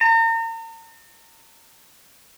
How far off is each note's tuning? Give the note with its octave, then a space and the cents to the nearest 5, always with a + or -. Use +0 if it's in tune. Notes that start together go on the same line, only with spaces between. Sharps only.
A#5 -40